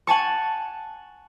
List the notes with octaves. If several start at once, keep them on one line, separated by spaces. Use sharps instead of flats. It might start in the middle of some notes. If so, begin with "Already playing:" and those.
F#5 G#5 A5 C#6